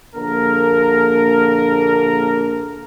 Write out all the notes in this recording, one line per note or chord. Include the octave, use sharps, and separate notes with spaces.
A#1 D3 A#3 A#4